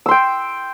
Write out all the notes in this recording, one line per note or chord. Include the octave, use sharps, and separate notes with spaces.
G5 C6 E6